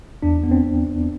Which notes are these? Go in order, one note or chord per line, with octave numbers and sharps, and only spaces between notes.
E2 D4
B3
C4